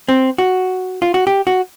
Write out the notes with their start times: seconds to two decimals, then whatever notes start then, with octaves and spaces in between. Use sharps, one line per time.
0.09 C4
0.38 F#4
1.02 F4
1.14 F#4
1.27 G4
1.47 F#4